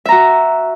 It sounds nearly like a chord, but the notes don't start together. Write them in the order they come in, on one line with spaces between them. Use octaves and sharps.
E5 A#5 F#4